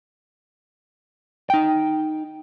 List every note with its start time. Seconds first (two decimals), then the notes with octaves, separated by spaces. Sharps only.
1.50 D#4 G5